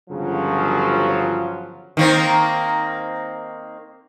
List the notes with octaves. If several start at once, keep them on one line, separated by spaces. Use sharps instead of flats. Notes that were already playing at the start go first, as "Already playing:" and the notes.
G1 C#3 F3 F#3
D#3 A#3 C4